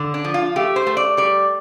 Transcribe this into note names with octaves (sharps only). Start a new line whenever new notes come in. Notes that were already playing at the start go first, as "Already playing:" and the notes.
Already playing: D3
D4
F3
F4
A3 G4
C5
A3
D5
G3 D5